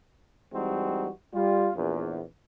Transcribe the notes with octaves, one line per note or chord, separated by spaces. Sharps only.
E3 G3 G#3 C4 D#4 F#4
G3 F4
A#1 E2